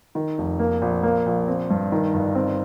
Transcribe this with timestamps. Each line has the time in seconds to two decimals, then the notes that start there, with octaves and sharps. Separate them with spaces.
0.15 D#3
0.38 F1
0.59 A#3
0.82 A#1
1.03 A#3
1.26 A#1
1.48 C4
1.70 G2
1.92 D#3
2.14 G1
2.35 C4